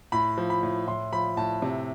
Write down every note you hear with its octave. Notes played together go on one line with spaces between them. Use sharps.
A2 B5
F3
B5
A2
A2 C6
F3 B5
A2 A5
C3